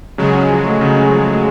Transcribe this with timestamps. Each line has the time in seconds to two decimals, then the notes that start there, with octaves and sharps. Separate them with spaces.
0.18 C#3 F#3 G#3
0.35 C#4
0.50 F3
0.65 A3
0.81 C#3
0.96 C#4
1.12 F3
1.28 A3